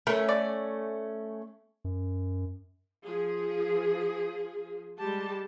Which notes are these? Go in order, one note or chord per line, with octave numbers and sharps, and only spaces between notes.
A3 C#4 A#4
D5
F#2
F3 G#4
G3 G#3 G4 A5